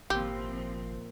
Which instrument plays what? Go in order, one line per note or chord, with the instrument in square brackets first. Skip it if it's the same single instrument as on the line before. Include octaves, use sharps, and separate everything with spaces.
[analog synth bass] G#1 [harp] A#2 E4 [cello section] F3 C4 [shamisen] G4